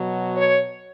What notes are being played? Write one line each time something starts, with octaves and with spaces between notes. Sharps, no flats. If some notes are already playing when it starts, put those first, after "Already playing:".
Already playing: B2 F#3
C#5